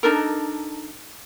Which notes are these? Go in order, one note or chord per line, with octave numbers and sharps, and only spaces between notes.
D4 D#4 A4 A#4